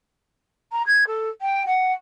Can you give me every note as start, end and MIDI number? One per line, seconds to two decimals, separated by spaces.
0.72 0.82 82
0.86 1.07 92
1.07 1.29 69
1.41 1.63 79
1.66 1.93 78